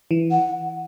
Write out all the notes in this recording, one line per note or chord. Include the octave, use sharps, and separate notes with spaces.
E3
F#5